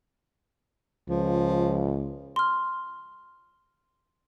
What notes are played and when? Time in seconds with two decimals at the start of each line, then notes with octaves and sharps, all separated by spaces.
1.09 C#2 F3
2.36 C6 F6